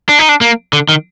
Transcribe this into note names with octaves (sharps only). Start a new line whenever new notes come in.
D4
D#4
D4
A#3
D3
D#3